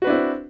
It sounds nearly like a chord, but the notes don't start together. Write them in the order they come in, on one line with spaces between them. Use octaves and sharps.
F#4 B4 D4 E4 C4